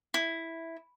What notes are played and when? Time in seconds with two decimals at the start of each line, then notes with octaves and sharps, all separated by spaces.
0.14 E4